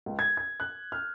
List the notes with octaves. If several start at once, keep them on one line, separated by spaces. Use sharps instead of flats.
C#2
G#6
G#6
F#6
F6